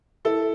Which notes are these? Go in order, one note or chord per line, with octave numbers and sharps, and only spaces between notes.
E4 A4